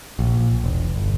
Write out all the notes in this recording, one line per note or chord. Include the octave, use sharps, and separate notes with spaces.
A#1
E1
G1